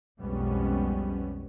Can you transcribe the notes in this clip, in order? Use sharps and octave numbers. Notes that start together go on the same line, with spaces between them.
B1 F2 G3 G#3 B3 C#4